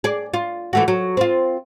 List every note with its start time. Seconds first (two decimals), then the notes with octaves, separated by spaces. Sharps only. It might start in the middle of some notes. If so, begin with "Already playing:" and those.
0.04 G#4 D5
0.34 F4
0.73 E3 A3 F#4
0.88 F#3
1.17 C4 F4